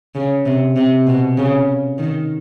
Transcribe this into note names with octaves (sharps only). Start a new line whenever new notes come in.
C#3
C3
C3
B2
C#3
D#3